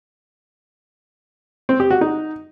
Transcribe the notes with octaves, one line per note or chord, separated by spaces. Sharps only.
C4
G4
F#4
D#4